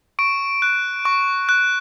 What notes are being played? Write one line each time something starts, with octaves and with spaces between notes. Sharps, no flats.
C#6 D7
F#6
C#6
F#6